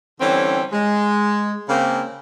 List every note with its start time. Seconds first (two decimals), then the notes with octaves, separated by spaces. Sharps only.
0.20 D3 E3 G3 C4 C#4 A4
0.73 G#3
1.69 C#3 A#3 C4